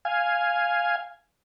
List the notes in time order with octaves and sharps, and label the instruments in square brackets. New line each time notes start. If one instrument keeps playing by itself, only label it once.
[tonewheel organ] F5 G#5